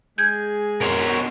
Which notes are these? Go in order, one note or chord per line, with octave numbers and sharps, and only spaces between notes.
G#3 G#4 G6 G#6
B2 A#4 C5 C#5